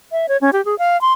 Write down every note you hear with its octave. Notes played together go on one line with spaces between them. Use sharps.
E5
C#5
C#4
G4
G#4
F5
C6